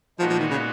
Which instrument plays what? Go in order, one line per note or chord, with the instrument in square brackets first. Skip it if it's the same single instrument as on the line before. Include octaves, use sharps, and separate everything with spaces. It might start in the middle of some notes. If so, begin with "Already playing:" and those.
[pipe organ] A#2 G#3 B3 D#4 F#4 [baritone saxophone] F3
[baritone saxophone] F3
D#3
C#3